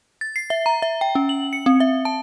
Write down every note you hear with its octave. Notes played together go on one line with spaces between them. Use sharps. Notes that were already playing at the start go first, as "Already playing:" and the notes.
A6
C7
E5
A#5
E5
G5
C#4
F#7
C#7
C4
E5
A5